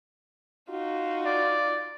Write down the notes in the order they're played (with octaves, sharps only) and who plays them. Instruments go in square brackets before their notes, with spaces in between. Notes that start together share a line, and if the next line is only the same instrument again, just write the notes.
[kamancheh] D#4 F4 [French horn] F#4
[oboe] D5